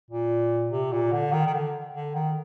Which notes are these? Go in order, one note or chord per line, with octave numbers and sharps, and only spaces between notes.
A#2
C3
A#2
D3
D#3
D#3
D3
D3
D#3